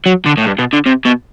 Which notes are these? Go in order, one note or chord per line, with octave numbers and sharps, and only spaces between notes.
F#3
D3
A2
G2
B2
D3
C3
B2